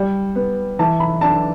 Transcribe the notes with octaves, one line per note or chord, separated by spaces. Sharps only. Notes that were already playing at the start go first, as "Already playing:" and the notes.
Already playing: G3
B3
E3 A5
B5
D4 A5